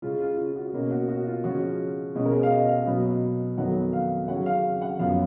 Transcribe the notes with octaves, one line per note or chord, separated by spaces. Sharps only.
C#3 G#3 C#4 F4
F4
F4
F#4
B2 A#3 C#4
F#4
F#4
F4
C#3 F3 G#3 C#4 F#4
B2 G#3 C#4 F#4
A#4
G#4
F5
D#5
F5
B2 F#3 B3
F2 D#3 F#3 B3 F#5
F5
C#3 F#3 C#4 F#5
F5
F#5
F#2 F3 B3 F5